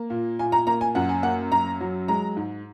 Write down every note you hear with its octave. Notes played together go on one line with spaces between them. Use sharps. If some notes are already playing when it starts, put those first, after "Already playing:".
Already playing: A#3
A#2
A#2 G#5
A#5
A#3 A#5
G#5
F#2 F#5
G#5
A#3 F#5
F#2 A#5
F#3
G#3 A#5
G#2